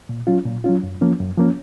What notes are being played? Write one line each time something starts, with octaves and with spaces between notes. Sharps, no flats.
A#2
F#3 C#4 F4
A#2
F#3 C#4 F4
F#2
F3 A#3 C#4
F#2
F3 A#3 C#4